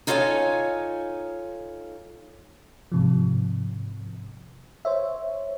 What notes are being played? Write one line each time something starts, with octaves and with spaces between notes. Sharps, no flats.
D#4 F4 A4 C#5 F5 G#5
G#2 C3 F3
C5 C#5 E5